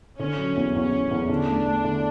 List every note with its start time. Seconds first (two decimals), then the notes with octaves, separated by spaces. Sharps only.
0.19 D3 C#4
0.38 F#3
0.56 E2
0.75 E2 C#4
0.92 E2
1.11 E2
1.29 D3 D4
1.48 A3
1.66 A3
1.84 D3